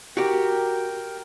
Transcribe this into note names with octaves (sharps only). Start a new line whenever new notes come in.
F#4 G4 A#4 G5